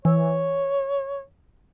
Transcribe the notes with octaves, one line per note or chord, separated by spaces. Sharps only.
E3 C#5